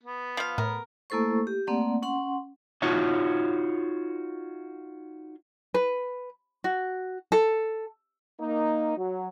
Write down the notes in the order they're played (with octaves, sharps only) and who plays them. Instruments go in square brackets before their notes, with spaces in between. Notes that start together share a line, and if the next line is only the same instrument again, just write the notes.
[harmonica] B3
[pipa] F3 F5
[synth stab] A2 [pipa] A#4
[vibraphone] A3 A#3 E4 A4 C5 C#6
G4
A3 A#3 C4 D5 F#5
C#4 F#5 C6
[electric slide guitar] D#4 F4 F#4 C#5 E5
[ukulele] B4
F#4
A4
[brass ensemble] A#3 D#4
F#3